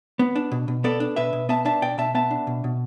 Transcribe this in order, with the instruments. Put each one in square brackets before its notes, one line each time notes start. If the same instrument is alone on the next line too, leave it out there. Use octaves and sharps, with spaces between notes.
[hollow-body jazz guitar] B3
D4
B2
B2
B3 A4 D5
D4
B2 B4 E5
B2
B3 E5 A5
D4 E5 A5
B2 D5 G5
B2 E5 A5
B3 E5 A5
D4
B2
B2